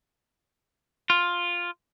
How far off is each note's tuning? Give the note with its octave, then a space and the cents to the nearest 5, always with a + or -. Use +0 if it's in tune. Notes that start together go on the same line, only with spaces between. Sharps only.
F4 +5